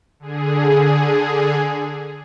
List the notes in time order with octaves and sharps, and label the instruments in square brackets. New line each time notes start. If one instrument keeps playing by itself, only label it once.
[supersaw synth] D3 G#4